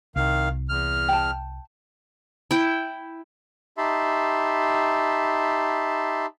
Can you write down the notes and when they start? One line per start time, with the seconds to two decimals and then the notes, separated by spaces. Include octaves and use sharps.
0.16 C2 D#3 F5
0.69 E2 F6
1.09 G5 A5
2.51 E4 G5
3.78 D#4 G4 E5 A5 B5 C6